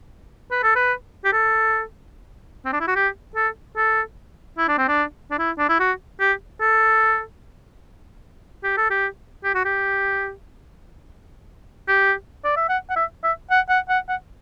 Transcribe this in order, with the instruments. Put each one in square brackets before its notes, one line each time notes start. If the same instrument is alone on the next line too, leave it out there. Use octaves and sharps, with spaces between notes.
[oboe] B4
A4
B4
G4
A4
C4
D4
E4
F#4
G4
A4
A4
E4
D4
C4
D4
D4
E4
D4
E4
F#4
G4
A4
G4
A4
G4
G4
F#4
G4
G4
D5
E5
F#5
F#5
E5
E5
F#5
F#5
F#5
F#5